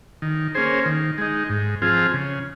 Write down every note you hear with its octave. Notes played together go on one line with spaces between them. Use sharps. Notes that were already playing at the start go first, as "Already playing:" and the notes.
D#3
A#3 C#4 G#4 C5
D#3
G#3 D#4
G#2
F3 C4 F4 G#4
C#3